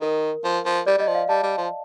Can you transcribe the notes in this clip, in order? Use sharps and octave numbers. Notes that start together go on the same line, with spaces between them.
D#3 A#4
F3
F3
G3 D5
G3 D#5
F3
F5
G3 A5
G3
F3